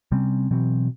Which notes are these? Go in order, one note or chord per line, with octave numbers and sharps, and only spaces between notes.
C3 G3 C4 C#4
B2 E3 F#3 C4